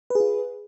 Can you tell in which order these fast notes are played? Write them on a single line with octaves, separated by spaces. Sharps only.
B4 G#4 F4